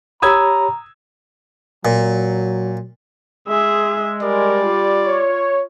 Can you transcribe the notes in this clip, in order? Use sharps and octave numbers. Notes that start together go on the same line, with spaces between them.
G4 C#5 A#5 B5 D#6 E6 G#6
A#2 F#3
G#3 G#4 E5
G3 A#4 D5
F4
C#5